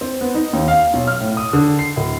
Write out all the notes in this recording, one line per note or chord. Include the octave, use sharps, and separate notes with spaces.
C4
B3
D#4
D#2
F5
B1
F6
A2
D#6
D3
C7
D1